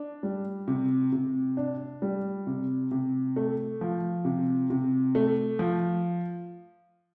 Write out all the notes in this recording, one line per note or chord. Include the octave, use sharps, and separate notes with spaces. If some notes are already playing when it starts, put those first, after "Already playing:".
Already playing: D4
G3
C3
C3
D4
G3
C3
C3
A3
F3
C3
C3
A3
F3